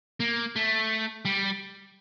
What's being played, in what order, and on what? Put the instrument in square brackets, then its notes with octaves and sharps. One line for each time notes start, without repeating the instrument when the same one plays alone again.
[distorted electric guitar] A#3
A3
G3